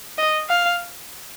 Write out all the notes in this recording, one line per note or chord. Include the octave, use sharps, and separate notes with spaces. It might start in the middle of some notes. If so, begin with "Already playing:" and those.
D#5
F5